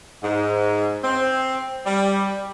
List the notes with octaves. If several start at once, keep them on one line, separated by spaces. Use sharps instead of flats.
G#2
C4
G3